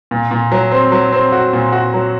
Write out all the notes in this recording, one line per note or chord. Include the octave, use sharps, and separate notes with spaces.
A#2
A#2
F#3
C4
F#3
C4
F#4
A#2
F#4
F#3